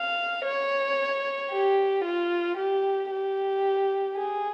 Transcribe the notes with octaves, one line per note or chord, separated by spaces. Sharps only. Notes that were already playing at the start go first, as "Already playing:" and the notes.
Already playing: F5
C#5
G4
F4
G4
G4
G#4